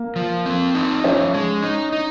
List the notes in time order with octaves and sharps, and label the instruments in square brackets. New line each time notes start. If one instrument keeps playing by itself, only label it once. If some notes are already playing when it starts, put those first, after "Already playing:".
Already playing: [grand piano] A#3 A#4
[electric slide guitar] F3
C4
D#4
[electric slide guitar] F3 [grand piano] C#4 C#5
[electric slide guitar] G#3
D#4
D#4